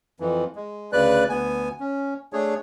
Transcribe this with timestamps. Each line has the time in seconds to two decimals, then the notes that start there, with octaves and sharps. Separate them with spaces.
0.20 F2 E3
0.56 G#3
0.93 D2 C#3 B4 D5 F#6
1.29 D2 B3 G#5
1.80 C#4
2.33 A3 D4 G#4 C#5